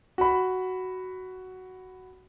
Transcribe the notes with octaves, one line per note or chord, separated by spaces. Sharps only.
F#4 B5